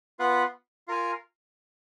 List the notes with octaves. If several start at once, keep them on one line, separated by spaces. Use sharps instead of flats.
B3 F4 B4 F#5
F4 A#4 F5 G#5